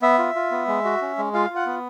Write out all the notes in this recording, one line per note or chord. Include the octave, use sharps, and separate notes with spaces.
B3 E5
F4
F4
B3
G#3
F#4
C#4
G#3
F4 F5
F4
F#5
B3